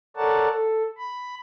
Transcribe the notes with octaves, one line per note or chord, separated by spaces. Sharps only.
A4 A#4 C#5 D5 F#5 A5
A4
B5